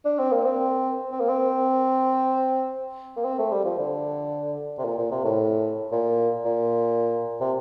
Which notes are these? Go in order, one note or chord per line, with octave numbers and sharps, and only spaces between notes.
D4
C4
A#3
C4
C4
A#3
C4
A#3
C4
A3
G3
F3
D3
C3
A#2
A#2
C3
A2
A#2
A#2
C3